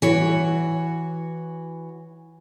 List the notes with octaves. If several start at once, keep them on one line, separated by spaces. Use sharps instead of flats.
E3 F#4 C#5